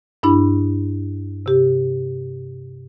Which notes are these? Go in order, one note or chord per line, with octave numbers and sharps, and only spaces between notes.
G2 D4 E4 B5
C3 G4